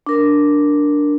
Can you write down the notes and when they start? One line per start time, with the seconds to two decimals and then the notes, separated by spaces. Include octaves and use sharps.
0.07 D4 A#4